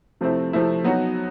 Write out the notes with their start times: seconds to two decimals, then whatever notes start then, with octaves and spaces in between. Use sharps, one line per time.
0.21 C3 F3 A3 C4 E4
0.53 C3 F3 A3 C4 E4
0.84 F#3 B3 D#4 F#4